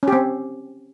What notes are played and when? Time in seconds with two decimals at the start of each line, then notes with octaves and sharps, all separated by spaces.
0.03 C#4
0.08 G4
0.13 C4